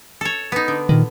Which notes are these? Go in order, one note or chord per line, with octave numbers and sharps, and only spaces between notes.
A4 C#5
B3 D#4
D3
A#2 D#3